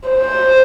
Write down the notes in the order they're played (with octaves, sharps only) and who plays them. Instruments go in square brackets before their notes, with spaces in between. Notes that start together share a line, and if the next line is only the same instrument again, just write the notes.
[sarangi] C5